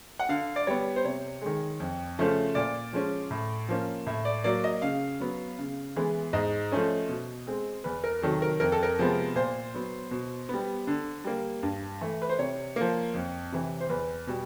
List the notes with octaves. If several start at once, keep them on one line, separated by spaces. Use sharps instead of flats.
F#5
D3 F5
D5
G3 B3 C#5
C5
C3 C#5
D#3 G#3
F2
C#3 F3 A3 C#4
A#2 D5
F3 G#3 C#4
A2
F3 A#3 C#4
A2 E5
D5
F#3 A#3 D5
D#5
C#3 F5
F#3 B3
C#3
E3 G#3 B3
G#2 D#5
F3 A3 C#4
B2
G#3 C4
E2 B4
A#4
C3 D#3 F#3 A4
A#4
F2 A#4
A4
A#4
C3 F3 G#3 B3
A#2 C5
F#3 B3
B2
G3 B3
D3
G3 A#3
G2
E3 A3
B4
C5
C3 C#5
F3 A#3
F2
C3 E3
C5
E2 B4
B2 G3